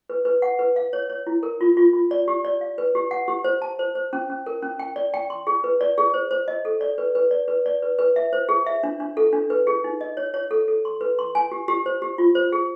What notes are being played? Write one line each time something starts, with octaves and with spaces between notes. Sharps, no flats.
B4
B4
F#5
B4
F5
C#5
C#5
E4
A#4
F4
F4
F4
D5
G4
D5
F5
B4
G4
F#5
G4
C5
A5
C5
C5
C#4
C#4
A#4
C#4
G5
D5
G5
C6
G#4
B4
D5
G#4
C5
C5
D#5
A4
D5
B4
B4
D5
B4
D5
B4
B4
E5
C5
G#4
E5
D4
D4
A4
D4
B4
G#4
D#4
D#5
C#5
C#5
A4
A4
C6
B4
C6
G#5
G4
G4
C5
G4
F4
C5
G#4